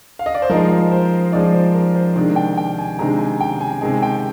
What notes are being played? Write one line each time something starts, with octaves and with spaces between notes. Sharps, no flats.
F5
D#5
D5
C5
F3 G#3 D#4 A#4
C5
F3 G#3 D#4 D5
C5
A#4
C5
C3 D#3 G#3 D4 D5
G5
G5
G#5
C3 D#3 G#3 D4 A#5
G#5
G5
G#5
C3 D#3 G#3 G#5
G5